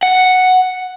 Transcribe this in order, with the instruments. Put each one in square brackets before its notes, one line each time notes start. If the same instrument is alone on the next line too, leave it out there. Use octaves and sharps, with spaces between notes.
[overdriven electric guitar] F#5